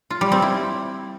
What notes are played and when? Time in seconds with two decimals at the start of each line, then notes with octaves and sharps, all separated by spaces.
0.10 F4
0.21 G3
0.32 C4
0.42 E4